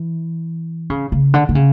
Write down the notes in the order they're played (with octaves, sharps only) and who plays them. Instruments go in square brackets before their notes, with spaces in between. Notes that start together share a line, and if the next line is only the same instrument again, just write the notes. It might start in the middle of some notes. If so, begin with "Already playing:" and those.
Already playing: [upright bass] E3
C#3
C#3
D3
D3
C#3